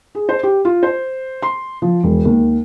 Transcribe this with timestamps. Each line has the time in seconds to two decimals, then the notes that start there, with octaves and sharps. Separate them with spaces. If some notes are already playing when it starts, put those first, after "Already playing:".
0.15 G#4
0.29 C5
0.43 G4
0.65 F4
0.83 C5
1.42 C6
1.82 F3
2.04 E1
2.25 D#2